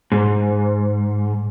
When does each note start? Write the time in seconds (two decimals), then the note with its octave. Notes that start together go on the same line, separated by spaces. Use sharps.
0.12 G#2